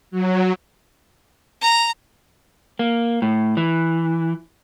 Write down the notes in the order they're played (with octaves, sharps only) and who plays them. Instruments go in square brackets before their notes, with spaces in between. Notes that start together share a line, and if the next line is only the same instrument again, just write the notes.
[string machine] F#3
[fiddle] A#5
[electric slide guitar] A#3
A2
E3